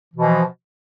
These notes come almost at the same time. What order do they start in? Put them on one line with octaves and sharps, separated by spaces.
E3 B2 F3